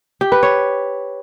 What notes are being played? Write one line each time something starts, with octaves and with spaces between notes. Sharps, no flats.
G4
B4
C#5